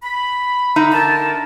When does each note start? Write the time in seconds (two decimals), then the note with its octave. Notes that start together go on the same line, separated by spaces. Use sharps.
0.03 B5
0.76 D3 D#4 E5
0.93 A#4 A5